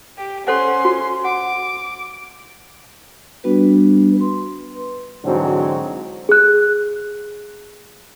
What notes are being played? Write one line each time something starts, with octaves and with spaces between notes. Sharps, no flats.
G4
C#4 A4 C5 F#5 C6
F#4
F#5 D6
G3 B3 D4 F#4 B4
B4 C6
G#2 D3 E3 F#3 C4 F#4
G#4 F#6